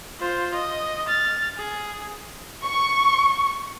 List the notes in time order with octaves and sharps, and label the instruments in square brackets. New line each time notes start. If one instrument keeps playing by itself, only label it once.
[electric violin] F4 C5
D#5
F6 A6
G#4
[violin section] C#6